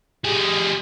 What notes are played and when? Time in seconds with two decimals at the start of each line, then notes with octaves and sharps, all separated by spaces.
0.24 G3 G#4